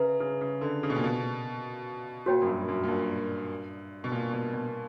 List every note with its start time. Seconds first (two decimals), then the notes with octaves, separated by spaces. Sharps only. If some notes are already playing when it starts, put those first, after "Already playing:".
Already playing: C#3 B4 E5 A#5
0.20 C#3
0.41 C#3
0.61 D3
0.83 C#3
0.90 B2
0.96 A#2
1.04 B2
2.26 A#2 F#4 C#5 G5 B5
2.42 F#2
2.47 G2
2.68 F#2
2.84 A#2
2.88 G2
4.04 B2
4.12 A#2
4.33 B2
4.54 B2